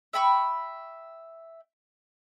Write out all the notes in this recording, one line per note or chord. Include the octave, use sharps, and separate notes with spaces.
E5 G5 B5 C#6